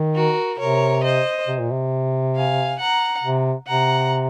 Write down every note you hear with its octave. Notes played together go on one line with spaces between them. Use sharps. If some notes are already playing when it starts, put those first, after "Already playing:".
Already playing: D#3
F#4 A#4
C3 A#4 C#5
C5 D#5
C3
A#2
C3
F5 G#5
F#5 A#5
C3
C3 F#5 A#5